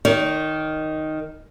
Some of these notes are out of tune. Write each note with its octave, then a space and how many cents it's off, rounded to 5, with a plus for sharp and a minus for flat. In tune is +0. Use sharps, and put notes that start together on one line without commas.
D#3 +0 C#5 +35